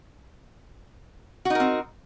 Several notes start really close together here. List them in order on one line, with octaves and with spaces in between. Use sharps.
F#4 D#4 A#4 C4